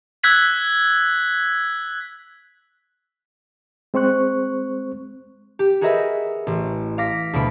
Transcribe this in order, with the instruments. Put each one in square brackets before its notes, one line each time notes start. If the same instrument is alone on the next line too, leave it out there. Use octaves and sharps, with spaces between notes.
[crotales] E6 F#6 G#6 B6 F#7
[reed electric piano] G#3 C4 C5 C#6 F#6
[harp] G4
F#4 G#4 A#4 B4 D#5 E5
A1
F5 D6 A#6 B6
D2 B2 B5 D7